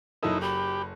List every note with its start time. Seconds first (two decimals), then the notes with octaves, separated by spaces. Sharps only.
0.23 F#1 F#3 D#4 E4 A4
0.42 G4 B5